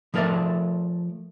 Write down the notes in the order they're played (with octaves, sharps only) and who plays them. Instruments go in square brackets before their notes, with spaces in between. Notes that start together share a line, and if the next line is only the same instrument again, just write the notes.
[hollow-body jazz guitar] F3 A3 A#4 C#5 D5 E5